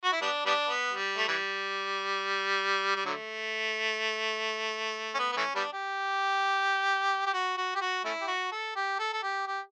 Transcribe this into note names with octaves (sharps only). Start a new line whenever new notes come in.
F#4
E4
G3 B3 D4
G3 B3 D4
B3
G3
A3
E3 G3
G3
D3 F#3 A3
C#4
B3
B3
E3 A3 C#4
G3 B3 D4
G4
G4
F#4
F#4
G4
F#4
A3 C#4 E4
G4
F#4
A4
G4
A4
A4
G4
G4